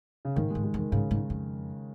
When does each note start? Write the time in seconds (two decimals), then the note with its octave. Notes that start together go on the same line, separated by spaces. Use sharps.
0.25 C#3
0.36 G#2 D#3
0.50 G#3
0.55 G#2
0.64 G#3
0.74 F2
0.78 D#3
0.92 G#2 C#3
1.11 G#2
1.30 F2